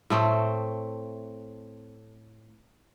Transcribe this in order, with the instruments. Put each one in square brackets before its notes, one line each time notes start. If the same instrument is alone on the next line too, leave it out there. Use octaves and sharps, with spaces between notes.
[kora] A2 A3 C4